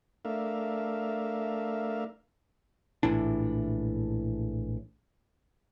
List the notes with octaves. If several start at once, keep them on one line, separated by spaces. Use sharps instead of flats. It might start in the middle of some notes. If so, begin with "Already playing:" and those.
A3 D4 A#4 E5 F5
A#1 A2 E3 D4